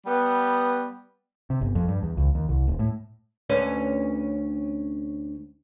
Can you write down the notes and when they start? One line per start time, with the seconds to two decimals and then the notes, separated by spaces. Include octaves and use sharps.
0.06 G3 B3
1.50 C3
1.61 G1
1.75 F2
1.88 G2
2.03 E2
2.17 C#2
2.35 D#2
2.49 C2
2.67 D#1
2.79 A2
3.49 D2 C#4 B4